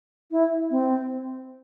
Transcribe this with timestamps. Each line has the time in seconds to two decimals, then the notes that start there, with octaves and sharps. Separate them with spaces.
0.31 E4
0.71 C4